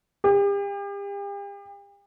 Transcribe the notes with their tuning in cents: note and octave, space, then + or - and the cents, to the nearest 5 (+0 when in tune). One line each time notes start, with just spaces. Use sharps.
G4 +40